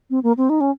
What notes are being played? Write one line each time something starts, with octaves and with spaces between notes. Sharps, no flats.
C4
A#3
C4
D#4
C#4